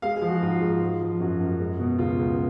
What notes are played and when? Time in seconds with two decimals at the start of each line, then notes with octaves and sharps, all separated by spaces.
0.02 G#3 F5
0.16 G#4
0.22 F3
0.28 F#4
0.42 G#2 F4
0.61 G#2
0.82 G#3
1.01 F3
1.20 F#2 F#4
1.40 F#2
1.60 G#3
1.80 B2
1.99 C#2 F4
2.19 C#2